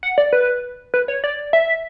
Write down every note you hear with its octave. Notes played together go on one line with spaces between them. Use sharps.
F#5
D5
B4
B4
C#5
D5
E5